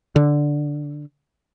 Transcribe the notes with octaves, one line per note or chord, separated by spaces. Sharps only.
D3